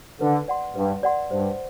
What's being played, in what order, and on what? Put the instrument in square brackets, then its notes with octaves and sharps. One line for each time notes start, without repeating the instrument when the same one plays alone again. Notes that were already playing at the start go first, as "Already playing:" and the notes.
[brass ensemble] D3 [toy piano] B4
[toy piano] D5 F#5 C6
[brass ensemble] G2 [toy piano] B4
[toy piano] D5 F#5 C6
[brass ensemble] G2 [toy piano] C5